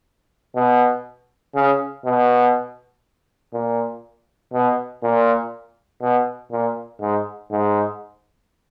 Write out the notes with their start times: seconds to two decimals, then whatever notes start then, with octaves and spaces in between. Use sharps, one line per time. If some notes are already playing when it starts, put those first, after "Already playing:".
0.56 B2
1.55 C#3
2.05 B2
3.53 A#2
4.53 B2
5.03 A#2
6.01 B2
6.51 A#2
7.01 G#2
7.51 G#2